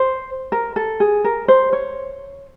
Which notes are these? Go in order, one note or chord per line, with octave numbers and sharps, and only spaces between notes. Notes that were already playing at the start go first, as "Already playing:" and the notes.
Already playing: C5
A#4
A4
G#4
A#4
C5
C#5